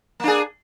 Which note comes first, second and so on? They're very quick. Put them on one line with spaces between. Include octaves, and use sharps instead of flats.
A#3 D4 G#4